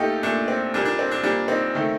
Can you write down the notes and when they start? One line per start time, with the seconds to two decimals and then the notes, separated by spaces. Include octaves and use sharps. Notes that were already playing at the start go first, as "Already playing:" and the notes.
Already playing: A#2 A3 D#4 F4 G4 A4
0.23 A#2 A3 D4
0.48 C4
0.74 A#2 G3 A#3 D4
0.85 D4
0.99 C4
1.11 D4
1.23 A#2 G3 A#3 D4
1.48 C4 D#4
1.75 D#3 A3